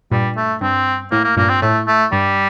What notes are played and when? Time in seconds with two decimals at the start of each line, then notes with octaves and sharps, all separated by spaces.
0.11 G2 A#2 G3
0.37 A3
0.61 G2 C4
1.12 A2 A#3
1.24 A#3
1.37 G2 A#2 A#3
1.49 C4
1.62 A2 A3
1.88 A3
2.12 G2 G3